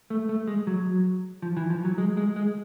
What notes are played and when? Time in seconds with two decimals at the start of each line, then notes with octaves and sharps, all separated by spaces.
0.10 A3
0.29 A3
0.47 G#3
0.67 F#3
1.42 F3
1.57 E3
1.70 F3
1.85 F#3
1.98 G#3
2.17 G#3
2.36 G#3